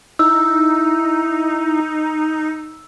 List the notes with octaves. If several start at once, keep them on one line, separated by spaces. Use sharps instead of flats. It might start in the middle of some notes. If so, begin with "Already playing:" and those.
D#4 E4 E6